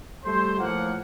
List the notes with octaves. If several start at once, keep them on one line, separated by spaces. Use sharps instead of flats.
G3 A3 C5
A2 F3 A#3 F#5